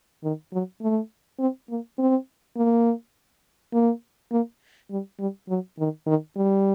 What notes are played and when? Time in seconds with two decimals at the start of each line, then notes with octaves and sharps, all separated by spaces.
0.23 D#3
0.53 F#3
0.82 A3
1.39 C4
1.70 A#3
1.98 C4
2.57 A#3
3.73 A#3
4.32 A#3
4.91 G3
5.19 G3
5.49 F#3
5.79 D#3
6.07 D#3
6.37 G3